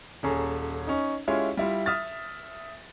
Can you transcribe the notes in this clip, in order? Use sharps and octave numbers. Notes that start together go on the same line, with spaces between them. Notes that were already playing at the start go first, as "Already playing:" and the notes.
D#1 C#4 G#4 A4 A#5
C#4 D#4
G#3 C#4 E4 F4 G4 C#5
G3 E4 F4
E5 D#6 F6 A6